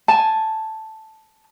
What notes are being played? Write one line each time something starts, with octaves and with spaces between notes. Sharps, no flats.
G#5 A5